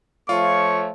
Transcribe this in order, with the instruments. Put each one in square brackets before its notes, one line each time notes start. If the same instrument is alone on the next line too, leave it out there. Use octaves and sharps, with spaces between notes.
[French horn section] F3 A3 C#5 [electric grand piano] F4 [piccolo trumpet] C#6